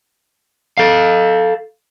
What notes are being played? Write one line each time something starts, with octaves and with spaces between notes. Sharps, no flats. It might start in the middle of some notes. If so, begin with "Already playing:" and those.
A4 F5